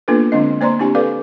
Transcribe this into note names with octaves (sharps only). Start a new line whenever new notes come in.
A#3 B3 D4 F4 A4 B4
D3 G#3 C4 D4 D#5
A#3 C5 D5 A#5 C6
A3 C4 D4 E4 G4 G#5
A4 B4 D5 F5 D6